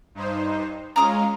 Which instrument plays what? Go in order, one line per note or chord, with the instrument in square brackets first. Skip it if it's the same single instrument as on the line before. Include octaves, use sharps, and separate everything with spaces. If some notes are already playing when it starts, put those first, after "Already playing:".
[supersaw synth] G2 D#4 C5
[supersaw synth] G#3 C#4 F4 [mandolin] A#5 D6 D#6